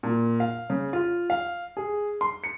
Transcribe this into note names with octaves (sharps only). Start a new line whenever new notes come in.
A#2
F5
C#3
F4
F5
G#4
C6
C#7